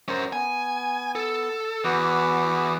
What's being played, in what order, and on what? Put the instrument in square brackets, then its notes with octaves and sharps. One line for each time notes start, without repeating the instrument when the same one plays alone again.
[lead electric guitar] C#4 A#4 [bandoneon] C5
[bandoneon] B3 [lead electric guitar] G#5
[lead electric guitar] A4
[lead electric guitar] E2 [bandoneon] F#4 B4 D6